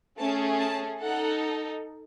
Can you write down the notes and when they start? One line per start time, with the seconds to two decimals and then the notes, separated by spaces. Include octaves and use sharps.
0.17 A3 C#4 G#4 A5
0.59 A5
1.01 D#4 A4 F#5